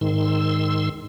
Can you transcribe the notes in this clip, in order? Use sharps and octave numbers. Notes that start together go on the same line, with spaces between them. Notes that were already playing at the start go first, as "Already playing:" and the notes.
G#2 D#3 C6 E6